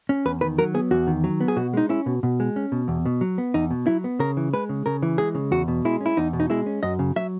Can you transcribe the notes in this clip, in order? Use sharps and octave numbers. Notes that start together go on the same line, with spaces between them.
C#4
E2 B4
D#3 B4
F#3 A#4
B3 G#4
E2 F#4
D#3
F#3
B3
G#4
B2 F#4
G#3 D#4
C#4 E4
B2
B2
G#3
C#4
B2
E2
B2
F#3
B3
E2 D#4
B2
F#3 E4
B3
C#3 A#4
E3
G#3 B4
C#3
C#3 A#4
E3
G#3 G#4
C#3
E2 F#4
B2
G#3 E4
C#4
E4
E2 D#4
B2
D#4
G#3 E4
C#4
F#2 D#5
C#3
F#3 E5